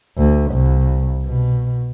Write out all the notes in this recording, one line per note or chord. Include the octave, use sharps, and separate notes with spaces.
D2
C2
B2